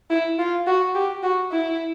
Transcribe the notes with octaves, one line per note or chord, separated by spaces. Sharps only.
E4
F4
F#4
G4
F#4
E4